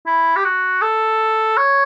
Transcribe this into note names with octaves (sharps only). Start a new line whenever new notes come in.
E4
G4
F#4
A4
C#5